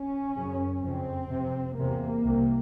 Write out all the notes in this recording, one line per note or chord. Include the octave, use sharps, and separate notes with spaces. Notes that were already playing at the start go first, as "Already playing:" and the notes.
Already playing: C#4
F#2 C#3
F2 C#3 C4
F2 C3
E2 C3 A#3
C2 C3